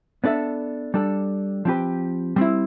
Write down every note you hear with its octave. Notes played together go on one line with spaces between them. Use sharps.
B3 D4 A4 E5
G3 D4 A4
F3 C4 G4 B4
G3 C4 E4